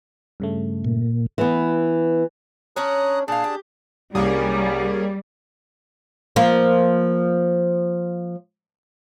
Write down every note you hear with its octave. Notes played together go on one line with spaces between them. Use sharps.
G2 C#3 A3
A#2
E3 B3
C#4 D4 C#5 A#5 D#6 F#6
A#2 D4 G#4 F5 A5
G4
C2 G3 A#3 C#4 G#4
F3 A#3